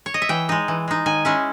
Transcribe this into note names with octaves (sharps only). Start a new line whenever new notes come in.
C#5
D#5
E5
E3 G5
G#3 D#4
E3
G#3 D#4
D#3 G#5
G#3 C#4 E4